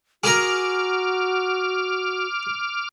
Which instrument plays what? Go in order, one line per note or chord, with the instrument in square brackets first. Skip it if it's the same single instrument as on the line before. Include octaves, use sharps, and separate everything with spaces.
[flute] F#4 [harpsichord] G#4 A#4 A#5 [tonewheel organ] D6 F6